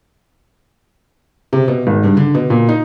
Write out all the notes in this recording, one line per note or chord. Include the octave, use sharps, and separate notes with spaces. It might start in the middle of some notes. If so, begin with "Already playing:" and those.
C3
B2
G#1
G2
D3
B2
A#2
D#4